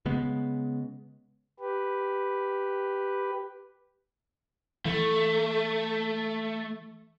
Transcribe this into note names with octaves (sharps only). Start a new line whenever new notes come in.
C#3 G#3 B3
G4 B4
E3 A3